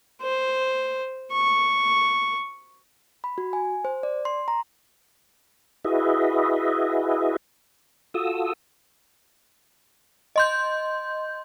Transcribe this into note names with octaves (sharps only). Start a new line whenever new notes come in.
C5
C#6
B5
F#4
G#5
C5
D5
C6
A#5
E4 F#4 G#4 B4 D#5 E5
F4 F#4 A4 D#6 E6
D#5 C6 G6